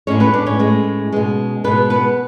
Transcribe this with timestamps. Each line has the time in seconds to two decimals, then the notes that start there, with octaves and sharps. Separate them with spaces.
0.07 A2 G#3 C#4 C#5
0.20 B3 B4
0.33 D4 D5
0.46 C#4 C#5
0.59 A2 G#3
1.12 B2 G#3
1.64 B2 G#3 B3 B4
1.90 B3 B4